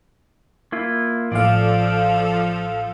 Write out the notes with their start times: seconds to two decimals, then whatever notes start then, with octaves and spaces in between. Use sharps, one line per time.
0.72 A#3 E4 F4
1.32 A1 F3 A4 D5 F5